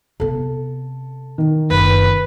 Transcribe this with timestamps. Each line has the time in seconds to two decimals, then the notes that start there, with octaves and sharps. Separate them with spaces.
0.20 C3 B3 A4
1.38 D#3
1.70 F#1 C3 B4